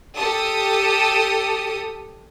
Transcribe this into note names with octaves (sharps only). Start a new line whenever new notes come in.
G4 A4 D#6